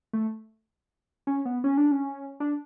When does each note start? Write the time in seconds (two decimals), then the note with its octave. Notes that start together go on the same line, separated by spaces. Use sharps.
0.13 A3
1.27 C#4
1.45 B3
1.64 C#4
1.77 D4
1.91 C#4
2.40 D4